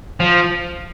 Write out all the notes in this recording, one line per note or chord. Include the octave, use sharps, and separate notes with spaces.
F3